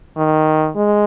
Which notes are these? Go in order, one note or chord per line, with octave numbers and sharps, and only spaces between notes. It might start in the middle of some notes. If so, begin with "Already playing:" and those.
D#3
G#3